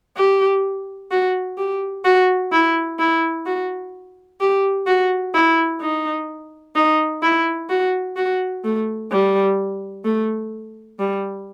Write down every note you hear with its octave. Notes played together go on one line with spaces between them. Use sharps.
G4
F#4
G4
F#4
E4
E4
F#4
G4
F#4
E4
D#4
D#4
E4
F#4
F#4
A3
G3
A3
G3